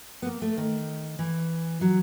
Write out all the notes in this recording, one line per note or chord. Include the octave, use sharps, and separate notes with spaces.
B3
A#3
A3
D#3
E3
F#3